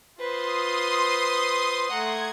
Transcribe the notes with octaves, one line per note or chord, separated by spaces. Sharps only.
F4 B4 C5 C6 D#6
A3 F#5 A#5 G#6